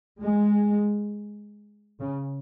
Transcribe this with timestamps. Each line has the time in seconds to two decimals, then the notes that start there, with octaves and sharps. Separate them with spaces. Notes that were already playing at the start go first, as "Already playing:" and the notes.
0.21 G#3
2.00 C#3